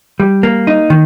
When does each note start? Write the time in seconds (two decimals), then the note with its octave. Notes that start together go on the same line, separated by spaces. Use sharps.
0.20 G3
0.43 A#3
0.67 D#4
0.90 D#3